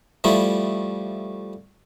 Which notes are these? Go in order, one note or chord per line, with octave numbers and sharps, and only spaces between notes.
F3 G3 A3 E4